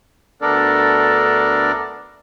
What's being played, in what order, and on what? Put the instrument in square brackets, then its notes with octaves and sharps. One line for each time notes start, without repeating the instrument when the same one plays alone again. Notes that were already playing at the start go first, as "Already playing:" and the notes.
[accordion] D2 B3 D4 A4 A#4 D5